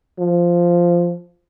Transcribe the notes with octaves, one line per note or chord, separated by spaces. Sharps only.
F3